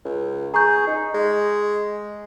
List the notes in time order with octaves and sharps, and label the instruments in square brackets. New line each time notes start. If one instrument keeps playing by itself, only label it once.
[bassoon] C#2
[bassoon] G#4 [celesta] A#5 C#6 G6
[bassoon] D#4
G#3